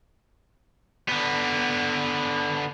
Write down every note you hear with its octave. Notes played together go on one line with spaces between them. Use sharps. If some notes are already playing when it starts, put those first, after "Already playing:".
D3 B3